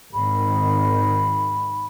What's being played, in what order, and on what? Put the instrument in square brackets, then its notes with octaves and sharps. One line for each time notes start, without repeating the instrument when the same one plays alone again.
[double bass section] G#1 D#3 [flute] B5